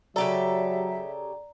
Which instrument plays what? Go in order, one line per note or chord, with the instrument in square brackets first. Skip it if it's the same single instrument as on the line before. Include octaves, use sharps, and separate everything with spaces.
[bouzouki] C#3 G4 A4 [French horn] F#3 [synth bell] D5 A#5 [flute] E5